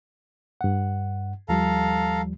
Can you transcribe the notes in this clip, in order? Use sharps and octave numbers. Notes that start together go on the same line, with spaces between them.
G2 F#5
D#2 F3 G3 A4 F5 A#5